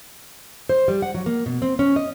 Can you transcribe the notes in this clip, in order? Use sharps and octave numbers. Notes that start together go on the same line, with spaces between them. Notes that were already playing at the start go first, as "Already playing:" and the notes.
C5
G3
F#5
F#3
A#3
B2
C4
C#4
D#5